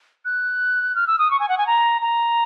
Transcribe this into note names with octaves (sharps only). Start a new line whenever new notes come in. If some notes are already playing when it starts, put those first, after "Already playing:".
F#6
F6
E6
D#6
C#6
G#5
F#5
G#5
A#5
A#5